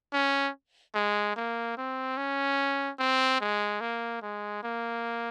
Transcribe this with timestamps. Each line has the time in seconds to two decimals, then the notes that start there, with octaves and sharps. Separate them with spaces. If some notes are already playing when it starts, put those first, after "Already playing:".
0.13 C#4
0.95 G#3
1.36 A#3
1.78 C4
2.17 C#4
2.99 C4
3.41 G#3
3.81 A#3
4.22 G#3
4.63 A#3